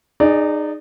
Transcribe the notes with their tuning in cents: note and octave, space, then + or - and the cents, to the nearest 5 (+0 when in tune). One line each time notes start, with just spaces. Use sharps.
D#4 -25 G#4 +0 D5 +0